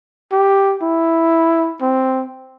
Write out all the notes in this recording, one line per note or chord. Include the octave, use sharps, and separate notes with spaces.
G4
E4
C4